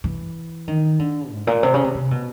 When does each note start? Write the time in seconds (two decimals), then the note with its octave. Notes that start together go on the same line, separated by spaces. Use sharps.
0.04 E3
0.68 D#3
0.99 D3
1.31 G#2
1.47 A#2
1.63 C3
1.74 C#3
1.84 C3
1.95 C3
2.11 B2